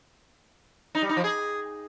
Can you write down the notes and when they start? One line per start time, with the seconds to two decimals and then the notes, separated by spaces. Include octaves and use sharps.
0.95 D#4
1.02 G3
1.09 D#4
1.17 F3
1.24 G#4